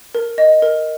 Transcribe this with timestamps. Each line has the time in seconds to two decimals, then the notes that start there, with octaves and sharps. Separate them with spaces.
0.15 A#4
0.38 D#5
0.62 A#4